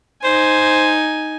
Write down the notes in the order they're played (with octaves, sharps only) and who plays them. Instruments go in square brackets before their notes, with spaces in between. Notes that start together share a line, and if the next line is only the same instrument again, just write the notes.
[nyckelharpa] D#4 G#5 [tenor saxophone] C5